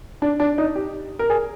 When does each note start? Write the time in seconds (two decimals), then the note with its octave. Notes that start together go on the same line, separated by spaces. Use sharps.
0.22 D4
0.40 D4
0.58 D#4
0.75 G4
1.19 A#4
1.30 G#4